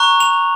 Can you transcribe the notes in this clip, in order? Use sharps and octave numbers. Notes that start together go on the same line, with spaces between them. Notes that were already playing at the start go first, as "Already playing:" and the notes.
Already playing: A#5 C#6 F#6
F7